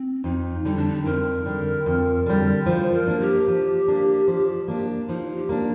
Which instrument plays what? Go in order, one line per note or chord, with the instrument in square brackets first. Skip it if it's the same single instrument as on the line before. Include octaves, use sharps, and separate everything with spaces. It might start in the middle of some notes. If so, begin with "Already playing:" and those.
Already playing: [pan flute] C4
[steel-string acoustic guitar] F2 [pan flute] D#4
[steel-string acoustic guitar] D3 G3 [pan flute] D#4
[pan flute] D4
D#4
[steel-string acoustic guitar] F2 [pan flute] A#4
[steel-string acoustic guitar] D3 G3
F2
D3 G3
[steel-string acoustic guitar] F3 [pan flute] C5
[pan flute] A#4
[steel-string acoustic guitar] A#3 D4
[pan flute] G4
[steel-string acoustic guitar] F3
A#3 D4
F3
A#3 D4
[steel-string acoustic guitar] F3 [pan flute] D#4
[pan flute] G4
[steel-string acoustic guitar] A#3 D4